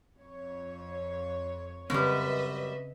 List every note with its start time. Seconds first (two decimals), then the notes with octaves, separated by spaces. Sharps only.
0.20 F2 C#5
1.90 F#2 C#3 G3 C4 B4 D#5 E5